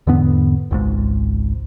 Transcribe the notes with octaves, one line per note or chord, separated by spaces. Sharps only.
E2 G#2 D3 B3
G#1 C#2 G#2